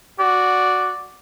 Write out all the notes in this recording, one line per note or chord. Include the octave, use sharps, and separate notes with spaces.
F#4 D5